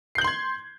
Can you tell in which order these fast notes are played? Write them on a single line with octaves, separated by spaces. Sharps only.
C7 G6 F#7 C6 G#6